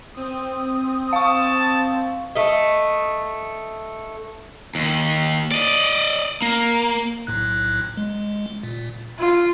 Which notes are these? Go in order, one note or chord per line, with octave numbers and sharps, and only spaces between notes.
C4 D#6
F5 A5 C#6
A3 D#5
D#2
D5 D#5
A#3
B1 A2 F#6
G#3
A#2
F4